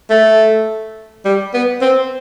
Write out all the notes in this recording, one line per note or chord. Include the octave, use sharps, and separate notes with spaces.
A3
G3
B3
C4